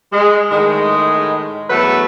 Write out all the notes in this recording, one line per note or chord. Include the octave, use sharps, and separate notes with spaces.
G#3
A2 D#3 G#3
E2 F#3 A3 B3 B4